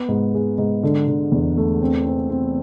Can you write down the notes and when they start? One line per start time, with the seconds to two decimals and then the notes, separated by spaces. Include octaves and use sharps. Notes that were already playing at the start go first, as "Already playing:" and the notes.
Already playing: B3
0.09 G#2
0.34 G#3
0.58 G#2
0.83 D3
1.08 D3
1.32 E2
1.57 A3
1.81 C4
2.05 C4
2.30 C4